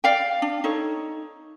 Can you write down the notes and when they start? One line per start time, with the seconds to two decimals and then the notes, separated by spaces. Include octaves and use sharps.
0.04 D5 F5 G5
0.42 D4
0.64 D#4 A4 C#5